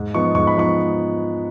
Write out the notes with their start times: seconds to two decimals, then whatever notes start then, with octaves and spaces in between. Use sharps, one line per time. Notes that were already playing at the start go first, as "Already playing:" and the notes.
Already playing: G#2
0.14 F3 B3 D#4 C#6
0.35 G#2 C#6
0.47 B5
0.56 F3 B3 D#4 C#6